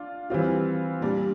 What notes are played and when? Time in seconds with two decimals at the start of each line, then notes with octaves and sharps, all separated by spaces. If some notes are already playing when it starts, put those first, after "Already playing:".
Already playing: D4 F4
0.30 E3 G3 C4 F4
1.01 A#2 G3 D4